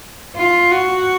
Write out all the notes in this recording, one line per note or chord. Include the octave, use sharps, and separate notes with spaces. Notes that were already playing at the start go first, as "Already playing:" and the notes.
F4
F#4